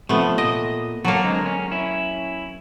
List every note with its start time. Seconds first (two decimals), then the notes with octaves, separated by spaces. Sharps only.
0.09 C3 F3 A3 B3
0.38 A#2 D#5
1.05 F#3 A#3 A4 C#5
1.23 D3 G#3 C4
1.46 C#4
1.71 C#4 E4